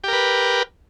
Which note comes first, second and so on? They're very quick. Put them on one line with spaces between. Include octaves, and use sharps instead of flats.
G4 A#4 B4